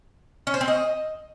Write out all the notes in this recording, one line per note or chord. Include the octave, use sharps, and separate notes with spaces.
C#4
C5
C4
D#5